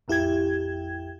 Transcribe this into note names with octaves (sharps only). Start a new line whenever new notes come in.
A1 F2 E4 G4 G5 G#6